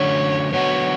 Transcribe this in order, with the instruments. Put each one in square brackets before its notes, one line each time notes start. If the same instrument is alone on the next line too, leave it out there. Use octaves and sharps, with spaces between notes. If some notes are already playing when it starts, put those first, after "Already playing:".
Already playing: [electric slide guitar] F#2 D3 F#3 A3 C#4 [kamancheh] C#5
[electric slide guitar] D3 F#3 B3 F#4 [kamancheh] C#5